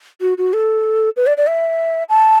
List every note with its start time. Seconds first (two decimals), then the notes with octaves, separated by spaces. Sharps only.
0.21 F#4
0.38 F#4
0.53 A4
1.17 B4
1.27 D5
1.37 D5
1.47 E5
2.09 A5